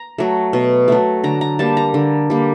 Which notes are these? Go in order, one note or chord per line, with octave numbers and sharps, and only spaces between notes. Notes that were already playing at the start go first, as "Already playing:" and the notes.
Already playing: A#5
F#3 A3
B2
F#3 A3
D3 A#5
A#5
G3 A#3 A5
A#5
D3
G3 A#3